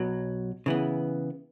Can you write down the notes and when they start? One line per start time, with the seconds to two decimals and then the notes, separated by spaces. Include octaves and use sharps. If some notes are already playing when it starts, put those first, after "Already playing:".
Already playing: B1 B2 F#3
0.66 C#3 E3 B3